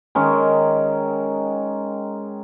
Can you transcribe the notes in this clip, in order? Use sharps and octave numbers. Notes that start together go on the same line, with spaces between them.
D#3 G#3 C#4